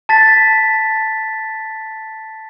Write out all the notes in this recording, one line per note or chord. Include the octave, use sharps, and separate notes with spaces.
A5 A6 B6